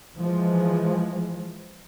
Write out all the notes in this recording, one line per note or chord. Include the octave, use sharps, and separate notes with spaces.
E3 F3 G#3